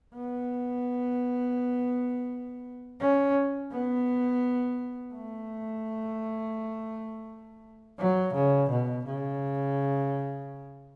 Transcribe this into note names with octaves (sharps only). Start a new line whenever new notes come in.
B3
C#4
B3
A3
F#3
C#3
B2
C#3